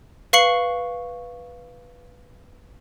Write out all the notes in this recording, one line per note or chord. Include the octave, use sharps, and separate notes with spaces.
B4 F5 C#6 C7 C#7 F#7